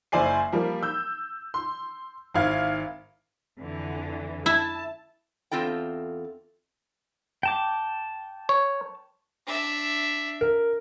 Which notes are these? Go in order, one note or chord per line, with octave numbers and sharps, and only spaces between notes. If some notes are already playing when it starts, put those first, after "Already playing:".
F#1 E4 C5 D5 G#5 C7
F3 G3 A#3
E6 G6
C6
G#1 E4 F5 G#6
F2 D3 E3
E4 A5
E2 C4 F4 A4 G5
G5 A5 D6
C#5
D4 E5
A#4